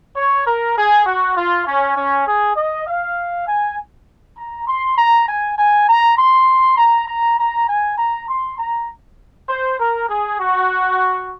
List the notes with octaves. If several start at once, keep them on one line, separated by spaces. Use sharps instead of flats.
C#5
A#4
G#4
F#4
F4
C#4
C#4
G#4
D#5
F5
G#5
A#5
C6
A#5
G#5
G#5
A#5
C6
A#5
A#5
A#5
G#5
A#5
C6
A#5
C5
A#4
G#4
F#4